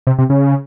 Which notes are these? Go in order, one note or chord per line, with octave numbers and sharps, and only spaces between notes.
C3
C3
C#3